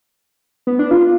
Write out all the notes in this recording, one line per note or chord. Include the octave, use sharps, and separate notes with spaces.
B3
D4
F4